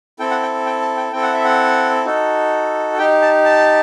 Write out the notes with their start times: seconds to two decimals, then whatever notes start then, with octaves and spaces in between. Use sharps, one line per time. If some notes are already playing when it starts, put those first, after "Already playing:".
0.19 C4 E4 A4 G5
0.31 F#5
0.42 G5
0.66 G5
0.82 A5
0.97 G5
1.13 C4 E4 A4 G5
1.23 F#5
1.34 E5
1.44 F#5
2.05 D#4 F#4 A4
2.98 D#4 G4 G5
3.22 A5
3.45 A5